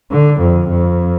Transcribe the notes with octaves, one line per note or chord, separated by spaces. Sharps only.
D3
F2
F2